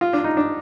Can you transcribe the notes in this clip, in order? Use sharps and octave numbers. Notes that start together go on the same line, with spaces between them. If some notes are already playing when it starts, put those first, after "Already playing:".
F4
D4
D#4
D4